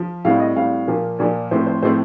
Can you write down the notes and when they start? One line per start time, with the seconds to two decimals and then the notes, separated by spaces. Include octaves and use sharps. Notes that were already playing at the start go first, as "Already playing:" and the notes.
Already playing: F3
0.25 A2 G3 C4 F5
0.40 D#5
0.56 A2 G3 C4 F5
0.88 A#2 F3 A#3
1.19 A#2 F3 A#3 D5
1.51 A2 F3 A3 C4 C5
1.67 C5
1.83 A2 F3 A3 C4 C5